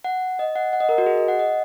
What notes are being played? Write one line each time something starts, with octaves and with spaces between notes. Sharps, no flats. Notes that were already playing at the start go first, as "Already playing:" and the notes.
F#5
D#5
F#5
F#5
D#5
A#4
F#4
G#4
D#5
F#5
D#5